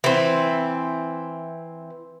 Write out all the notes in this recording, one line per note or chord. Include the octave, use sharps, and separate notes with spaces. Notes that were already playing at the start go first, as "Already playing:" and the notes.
E3 C4